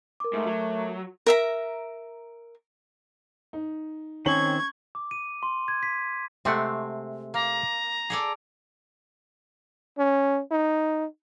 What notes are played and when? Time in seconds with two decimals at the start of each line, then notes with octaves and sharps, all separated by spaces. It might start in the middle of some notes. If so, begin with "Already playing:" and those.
0.20 A#4 D6
0.33 G#2 A3
0.46 F#3
1.26 A#4 E5 A#5
3.53 D#4
4.26 D#3 C4 C#4 C#6 G#6 F#7
4.95 D6
5.11 D#7
5.43 C6
5.68 G#6
5.83 B6
6.45 C3 G#3 A3 C4 F#5
7.34 A#3 A#5
8.10 G#4 A4 D5
9.98 C#4
10.51 D#4